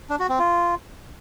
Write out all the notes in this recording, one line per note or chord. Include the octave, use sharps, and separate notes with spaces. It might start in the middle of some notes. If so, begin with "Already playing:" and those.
D4
F#4
C4
F4